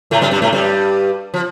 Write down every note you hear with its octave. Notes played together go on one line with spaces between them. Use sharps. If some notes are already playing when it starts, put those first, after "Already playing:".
A2 A3
G2 G3
G2 G3
A2 A3
G2 G3
F3